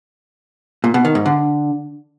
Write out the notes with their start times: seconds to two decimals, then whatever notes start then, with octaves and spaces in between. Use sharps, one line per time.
0.84 A#2
0.94 B2
1.05 D#3
1.15 G#2
1.26 D3